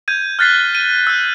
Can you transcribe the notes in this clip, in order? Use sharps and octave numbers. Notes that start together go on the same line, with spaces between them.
G6 G#6 D#7
F6 F#6 A6 B6 C7 G7
D#7
E6 G6